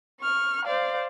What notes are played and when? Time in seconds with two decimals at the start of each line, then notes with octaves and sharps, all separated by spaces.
0.20 C#6 F6
0.64 C5 D5 F5